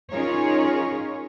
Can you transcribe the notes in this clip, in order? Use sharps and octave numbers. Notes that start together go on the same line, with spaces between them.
C#4 D#4 F4 G#4 A#4 C#5